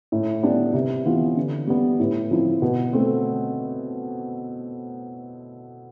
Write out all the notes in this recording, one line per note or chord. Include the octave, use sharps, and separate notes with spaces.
A2
G3 B3 D4 G4
C3
E3 B3 F4
D3
G3 B3
A2
F3 C4 E4
B2
A3 C4